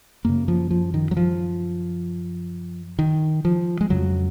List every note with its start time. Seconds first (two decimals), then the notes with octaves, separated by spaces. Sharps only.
0.25 F#2 C#3 A#3
0.48 F3
0.71 F3
0.94 D#3
1.11 F#3
1.17 F3
2.99 D#3
3.45 F3
3.81 G#3
3.90 F2 C#3 F#3